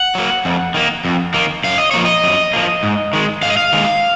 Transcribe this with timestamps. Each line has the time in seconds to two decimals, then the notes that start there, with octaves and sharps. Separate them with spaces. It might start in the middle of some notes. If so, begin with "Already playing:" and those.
Already playing: F#5
0.15 F#3 A#3
0.45 F2
0.74 D#3 A#3
1.05 F2
1.34 D#3 A#3
1.64 F#2 F5
1.78 D#5
1.91 F3 A#3 C#5
2.05 D#5
2.24 F#2
2.53 F3 A#3
2.83 G#2
3.13 D#3 G#3
3.42 G#2 F5
3.50 D#5
3.57 F5
3.72 D#3 G#3